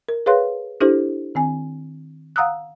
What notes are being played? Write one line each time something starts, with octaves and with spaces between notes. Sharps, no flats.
A#4
G#4 B4 C#5 F5 C6 F#6
D4 E4 G4 A4 C5
D#3 C4 G#5
F5 F#5 A#5 D#6 E6 F#6